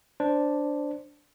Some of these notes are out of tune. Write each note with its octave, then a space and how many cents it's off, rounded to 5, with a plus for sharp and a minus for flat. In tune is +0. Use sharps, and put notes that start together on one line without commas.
D4 +0 C5 +0